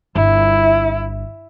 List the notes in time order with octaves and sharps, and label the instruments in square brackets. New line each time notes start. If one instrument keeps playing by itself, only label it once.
[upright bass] G1 [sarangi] E4